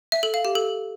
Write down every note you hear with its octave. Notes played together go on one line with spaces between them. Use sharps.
E5
A4
F5
G4
A4